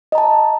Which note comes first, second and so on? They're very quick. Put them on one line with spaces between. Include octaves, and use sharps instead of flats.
D#5 A#5 A5